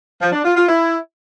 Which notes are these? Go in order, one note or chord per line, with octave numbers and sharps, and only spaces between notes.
F3
D4
F4
F4
E4